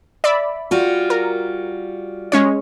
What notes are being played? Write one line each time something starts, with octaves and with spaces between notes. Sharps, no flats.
D5 E5 B5
G3 F4 F#4
A#4
G#3 C#4 C#5